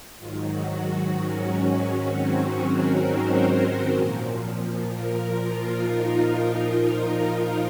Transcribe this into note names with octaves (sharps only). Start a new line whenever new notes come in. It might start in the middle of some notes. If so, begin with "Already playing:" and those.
G#2 D#3 F#3 F4
F#4
C#4
C#4
C#4
C4
C#4
A#4
C5
A#2 F3
A#4
F4
D#4